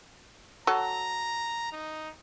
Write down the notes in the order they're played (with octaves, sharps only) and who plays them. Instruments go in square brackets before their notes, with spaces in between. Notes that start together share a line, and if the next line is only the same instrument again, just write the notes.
[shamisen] F#3 A4 [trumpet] A#5
[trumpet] D#4